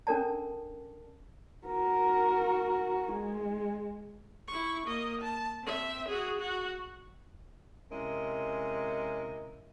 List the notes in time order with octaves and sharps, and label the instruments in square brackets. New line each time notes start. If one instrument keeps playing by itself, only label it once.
[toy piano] C#4 D4 A4 A#4 D5 A5
[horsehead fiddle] F#4 A#4
G#3
[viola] E4 C#6
A#3 D#5
A5
C4 E5
F#4 G#4
F#4
[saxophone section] C3 G#3 C#4 E4 A#4 D#5